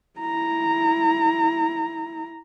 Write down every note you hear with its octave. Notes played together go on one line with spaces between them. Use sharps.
E4 A#5